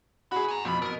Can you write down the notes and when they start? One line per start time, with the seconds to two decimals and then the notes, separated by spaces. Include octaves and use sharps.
0.32 D3 F#4 G#4 B5
0.48 G#5 A#5
0.65 F2 G#2 B2 B5
0.82 B2 A#4